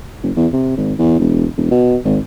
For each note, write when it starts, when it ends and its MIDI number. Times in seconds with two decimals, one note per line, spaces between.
0.23 0.31 30
0.36 0.47 40
0.53 0.74 48
0.77 0.93 32
0.99 1.16 40
1.19 1.45 28
1.57 1.71 28
1.71 1.96 47
2.05 2.18 32